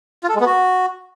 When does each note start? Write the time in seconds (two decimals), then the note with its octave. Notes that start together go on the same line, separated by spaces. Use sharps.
0.24 F4
0.29 A4
0.35 G#3
0.40 B3
0.46 F#4